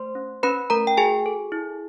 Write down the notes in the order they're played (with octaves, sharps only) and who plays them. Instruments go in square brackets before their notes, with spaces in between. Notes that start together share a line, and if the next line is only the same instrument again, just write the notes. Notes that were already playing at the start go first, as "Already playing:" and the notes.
Already playing: [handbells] A3 C5 C6
C#4
C#4 B4 B5
A3 A#4 A#5
G5
F#4 G#4 G#5
A4
E4